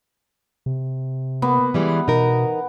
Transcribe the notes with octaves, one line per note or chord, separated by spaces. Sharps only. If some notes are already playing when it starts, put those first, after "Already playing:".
C3
A#3 B3
E3 G3 G#3
B2 D#4 A#4